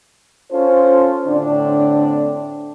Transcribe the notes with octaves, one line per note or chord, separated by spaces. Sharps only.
C#4 F4 A4 C5
A2 D3 C4 D4